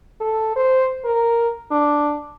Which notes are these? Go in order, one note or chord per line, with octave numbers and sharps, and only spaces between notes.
A4
C5
A#4
D4